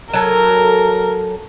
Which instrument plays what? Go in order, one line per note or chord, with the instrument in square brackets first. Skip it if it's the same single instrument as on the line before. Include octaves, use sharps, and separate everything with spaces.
[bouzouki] F#3 A4 G#5 [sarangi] A#4